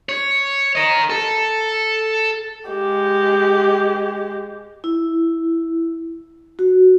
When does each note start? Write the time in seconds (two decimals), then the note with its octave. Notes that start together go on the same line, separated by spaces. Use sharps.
0.09 C#5
0.75 A#4 D#5
1.10 A4
2.69 G#3 G4
4.84 E4
6.59 F#4